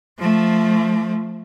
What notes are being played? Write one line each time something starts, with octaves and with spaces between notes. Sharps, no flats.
F3 A3